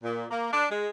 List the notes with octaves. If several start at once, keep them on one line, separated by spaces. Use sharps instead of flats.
A#2
A#3
D4
G#3